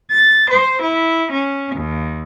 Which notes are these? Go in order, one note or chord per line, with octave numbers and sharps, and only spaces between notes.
A6
C5
E4
C#4
D#2